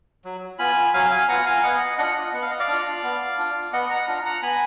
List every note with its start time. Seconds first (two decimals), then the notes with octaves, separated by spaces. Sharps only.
0.25 F#3
0.59 B3 F4 G#5 B5
0.93 F#3 F5 G#5
1.11 F5 G#5
1.28 B3 F4 F#5 A#5
1.46 F5 G#5
1.63 B3 D#5 F#5
1.98 D4 F4 D#5 F#5
2.33 B3 F#5
2.42 F5
2.51 D#5
2.59 D5 F5
2.68 D4 F4
3.03 B3
3.38 D4 F4
3.73 B3 D#5 F#5
3.90 F#5 A#5
4.08 D4 F4
4.25 F#5 A#5
4.43 B3 G#5 B5